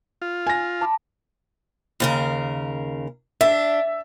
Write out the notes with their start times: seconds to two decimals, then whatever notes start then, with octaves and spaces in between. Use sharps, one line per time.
0.22 F4
0.47 G#5 A#6
0.81 A5 B5 D6
2.00 D#2 C#3 A#4
3.41 D4 E5